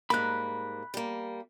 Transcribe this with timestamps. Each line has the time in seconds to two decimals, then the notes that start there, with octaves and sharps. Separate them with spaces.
0.10 G#2 G3 A#3 B5 F#6
0.94 G3 A#3